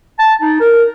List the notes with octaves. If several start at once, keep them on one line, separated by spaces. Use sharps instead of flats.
A5
D#4
A#4